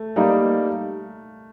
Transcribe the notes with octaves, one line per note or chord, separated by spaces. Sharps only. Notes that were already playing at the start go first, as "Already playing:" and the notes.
Already playing: A3
G3 A#3 D#4 A#4